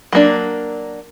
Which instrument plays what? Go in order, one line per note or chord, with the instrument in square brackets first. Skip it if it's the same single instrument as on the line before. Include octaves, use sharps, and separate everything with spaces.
[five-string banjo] F#3 A#3 D4